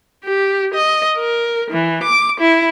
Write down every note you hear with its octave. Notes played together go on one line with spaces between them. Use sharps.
G4
D#5
A#4
E3
D6
E4